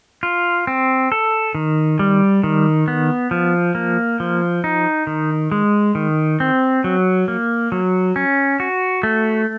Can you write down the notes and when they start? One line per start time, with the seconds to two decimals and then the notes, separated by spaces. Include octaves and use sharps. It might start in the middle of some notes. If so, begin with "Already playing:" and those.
0.23 F4
0.67 C4
1.12 A4
1.55 D#3
1.99 G3
2.44 D#3
2.88 B3
3.31 F3
3.75 A#3
4.20 F3
4.64 D#4
5.07 D#3
5.52 G#3
5.95 D#3
6.40 C4
6.84 F#3
7.28 A#3
7.72 F#3
8.16 C#4
8.60 F#4
9.03 A3